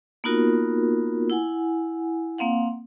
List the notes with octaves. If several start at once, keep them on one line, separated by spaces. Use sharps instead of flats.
A#3 B3 D#4 F4 F#4 A#4
E4 F#5 G#5
A#3 C4 F5 F#5